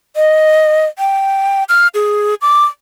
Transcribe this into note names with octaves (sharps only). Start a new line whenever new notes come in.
D#5
G5
F6
G#4
D6